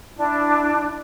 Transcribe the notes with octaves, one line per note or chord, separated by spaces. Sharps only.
D4 E4